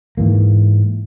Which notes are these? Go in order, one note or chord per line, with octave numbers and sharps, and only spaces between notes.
G#2 E3 A#3